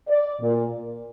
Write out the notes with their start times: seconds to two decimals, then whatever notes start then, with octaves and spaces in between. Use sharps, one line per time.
0.09 D5
0.42 A#2